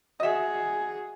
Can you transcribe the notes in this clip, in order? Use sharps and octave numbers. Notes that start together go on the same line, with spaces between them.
F#4 G#4 D#5 E5